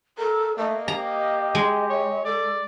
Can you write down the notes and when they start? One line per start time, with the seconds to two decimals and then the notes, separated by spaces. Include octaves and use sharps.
0.18 A4 A#4
0.58 A3 A#3 D#5
0.88 G4 A#5
1.55 G#3
1.90 C#5
2.25 A4 D5